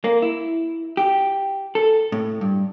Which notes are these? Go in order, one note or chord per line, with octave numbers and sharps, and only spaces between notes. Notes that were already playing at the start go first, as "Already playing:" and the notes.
A#3
E4
G4
A4
A2
G2